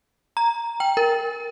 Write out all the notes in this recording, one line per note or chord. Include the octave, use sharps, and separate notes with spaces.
A#5
G5
A#4